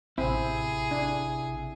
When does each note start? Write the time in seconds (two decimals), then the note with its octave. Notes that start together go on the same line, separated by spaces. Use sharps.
0.18 A1 C3 C4 E4 G#4
0.91 D4